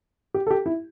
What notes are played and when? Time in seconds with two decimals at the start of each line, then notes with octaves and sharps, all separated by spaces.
0.34 G4
0.47 A4
0.51 G4
0.66 E4